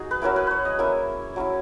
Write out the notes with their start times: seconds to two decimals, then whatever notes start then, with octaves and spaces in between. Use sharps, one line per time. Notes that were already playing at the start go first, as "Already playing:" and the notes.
Already playing: D#4 F#4 G#4
0.11 B4
0.22 F#3 C#4 E4 A#4
0.36 B4
0.47 B4 C#5
0.65 D#5
0.79 A#3 C#4 E4 E5
1.36 F#3 C#4 E4